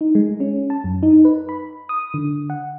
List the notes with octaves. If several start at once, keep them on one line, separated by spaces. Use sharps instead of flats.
D#4
G#3
C#4
A5
F#2
D#4
B4
B5
D#6
D3
F#5